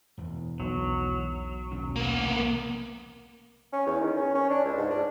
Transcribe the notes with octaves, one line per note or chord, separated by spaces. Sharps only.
E1 E2
B1 F#3
D#2 B2 C#4
A#3 B3
F1
C#4
E2
D#3
C#4
C#4
D4
C#2
G#2
D4